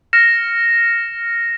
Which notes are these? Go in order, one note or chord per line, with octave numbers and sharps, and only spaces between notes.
F6 A#6 C#7 E7